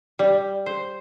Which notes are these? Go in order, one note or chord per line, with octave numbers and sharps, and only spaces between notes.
G3
C5